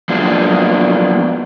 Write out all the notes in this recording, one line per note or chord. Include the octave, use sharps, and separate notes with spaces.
F3 F#3 G#3 A#3 B3 D4